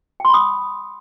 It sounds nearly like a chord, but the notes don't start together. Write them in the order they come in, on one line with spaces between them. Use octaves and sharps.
G5 C6 B5 D#6